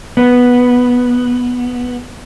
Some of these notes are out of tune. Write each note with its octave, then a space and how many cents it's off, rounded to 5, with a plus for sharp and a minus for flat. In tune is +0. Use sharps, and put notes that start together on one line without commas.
B3 -5